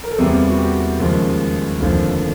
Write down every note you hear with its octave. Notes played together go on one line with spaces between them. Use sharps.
A#4
A4
E2 C3 E3 G3 A#3 G#4
F#4
G4
D#2 C#3 F3 G#3
F1 D#2 D3 F3